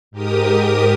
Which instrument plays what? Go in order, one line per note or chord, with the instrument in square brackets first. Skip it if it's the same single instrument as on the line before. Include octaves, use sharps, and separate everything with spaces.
[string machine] G#2 G4 A#4 D#6